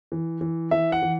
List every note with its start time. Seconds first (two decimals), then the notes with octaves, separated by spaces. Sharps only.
0.12 E3
0.41 E3
0.71 E3 E5
0.92 F#5
1.02 E3